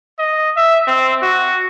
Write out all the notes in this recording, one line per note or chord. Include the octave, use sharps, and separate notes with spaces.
D#5
E5
C4
F#4